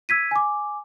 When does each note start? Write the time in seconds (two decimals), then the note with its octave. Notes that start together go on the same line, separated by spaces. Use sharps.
0.09 E6 G#6 B6 D#7
0.31 G#5 D6